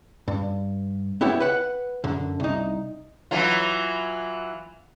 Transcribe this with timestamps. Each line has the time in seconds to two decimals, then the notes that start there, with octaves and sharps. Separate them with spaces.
0.28 G2
1.21 B3 E4 G4 C#5
1.40 B4 F#5
2.04 F#2 D3
2.40 C2 D#4
3.31 E3 F#3 F4